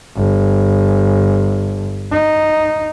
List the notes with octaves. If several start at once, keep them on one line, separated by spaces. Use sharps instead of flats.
G1
D#4